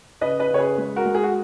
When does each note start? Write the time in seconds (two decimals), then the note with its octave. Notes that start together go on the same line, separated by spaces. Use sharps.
0.21 C#3 B4 D#5
0.40 B4 D#5
0.49 C#3 C#5
0.58 G#4 B4
0.78 G#3
0.96 F#4 A#4
1.06 G#3
1.15 G#4
1.23 F#4